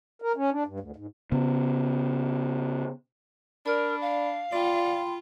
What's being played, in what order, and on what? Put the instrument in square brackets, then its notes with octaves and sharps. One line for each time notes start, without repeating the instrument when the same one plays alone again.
[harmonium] A#4
C#4
D4
G2
D2
G#2
[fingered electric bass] C#3 B3
[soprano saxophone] D4 [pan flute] A#4 [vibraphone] D5 B5
[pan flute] F5
[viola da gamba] F4 [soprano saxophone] D5 [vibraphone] G5 B5 C6